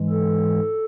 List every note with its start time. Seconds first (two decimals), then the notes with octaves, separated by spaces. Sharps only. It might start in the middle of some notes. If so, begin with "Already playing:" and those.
Already playing: G#2 E3 G#3
0.10 A4